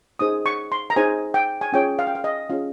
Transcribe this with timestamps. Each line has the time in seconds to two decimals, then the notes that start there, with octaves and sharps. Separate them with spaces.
0.19 D#4 G#4 C5 D#6
0.46 C#6
0.72 C6
0.90 A#5
0.96 D#4 G#4 C5 G#5
1.34 G5
1.61 G#5
1.72 C#4 F4 G#4 C#5 G5
1.99 F5
2.07 G5
2.15 F5
2.24 D#5
2.49 C#4 F4 G#4 C#5 F5